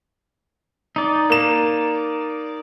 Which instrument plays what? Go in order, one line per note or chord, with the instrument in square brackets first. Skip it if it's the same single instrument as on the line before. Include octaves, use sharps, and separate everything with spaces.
[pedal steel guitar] D#4 D5
[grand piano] A#3 E7